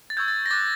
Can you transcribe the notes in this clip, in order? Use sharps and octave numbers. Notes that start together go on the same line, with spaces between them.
A6
C#6 E6 G6 G#6
A6
A#6
D6 F#6 A6